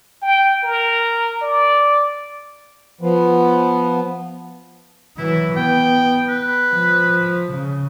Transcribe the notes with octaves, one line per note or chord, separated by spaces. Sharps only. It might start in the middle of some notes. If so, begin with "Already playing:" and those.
G5
A#4
D5
F3 B3
E3 F#3 E4
B3 G5
B4
F3
C#3